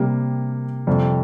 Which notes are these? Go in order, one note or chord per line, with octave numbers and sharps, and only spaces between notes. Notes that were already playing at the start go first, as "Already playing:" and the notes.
Already playing: C3 G3 A#3
F2 C3 G3